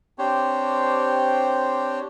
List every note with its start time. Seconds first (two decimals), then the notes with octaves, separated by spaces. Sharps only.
0.19 C4 D4 G4 C5 C#5